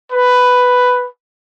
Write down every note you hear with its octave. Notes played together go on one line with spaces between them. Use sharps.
B4